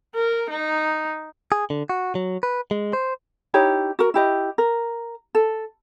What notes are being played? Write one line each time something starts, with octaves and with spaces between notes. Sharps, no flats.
A#4
D#4
G#4
D3
F#4
F#3
B4
G#3
C5
D#4 E4 G4 C#5
F#4 A#4
E4 G4 D#5
A#4
A4